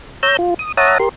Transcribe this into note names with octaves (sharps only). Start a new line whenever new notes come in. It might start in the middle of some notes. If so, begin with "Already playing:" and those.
C#5 A#5 E6 G6
F4
D#6
C#5 E5 F#5 A5 A#5 D#6
G4 A#4 C6